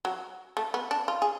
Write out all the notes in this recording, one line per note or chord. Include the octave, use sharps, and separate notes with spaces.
F#3
A3
B3
D4
F4
G#4